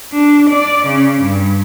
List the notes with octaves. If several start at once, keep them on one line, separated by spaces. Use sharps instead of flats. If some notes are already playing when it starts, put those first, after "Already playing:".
D4
D5
C#3
G2